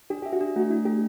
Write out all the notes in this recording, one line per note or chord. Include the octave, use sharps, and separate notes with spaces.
D4 G4
G4 E5
F#4
D4
A3 F#4
D4 E4
A3 G4